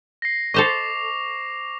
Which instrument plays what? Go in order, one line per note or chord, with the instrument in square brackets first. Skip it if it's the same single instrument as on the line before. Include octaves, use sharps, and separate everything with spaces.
[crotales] A#6 C7
[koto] A4 C5 D#5 [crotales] C#6 D6 F7